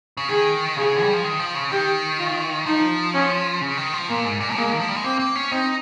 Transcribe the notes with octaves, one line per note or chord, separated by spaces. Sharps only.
C#3
D#3 G#4
C#3 G#4
G3
F3
D#3
F3
C#3
D#3 G4
F4
F3 D#4
C#4
C#3
D#3
F3
A#2 A#3
G#2
A#2
G#3 A#3
D#3
F3
G3
G#3
A#3 C4
A#3
C#4
C4 D#4